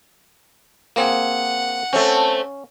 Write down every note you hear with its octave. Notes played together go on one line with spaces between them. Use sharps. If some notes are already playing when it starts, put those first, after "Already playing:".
A#3 C4 G#4 F#5
A3 C4 C#4